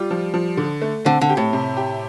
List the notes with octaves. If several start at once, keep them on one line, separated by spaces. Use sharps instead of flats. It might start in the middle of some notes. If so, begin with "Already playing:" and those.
Already playing: G3 F4
F3
F3
D3
A3
D3 C4
D3
G4
A2
C3
G4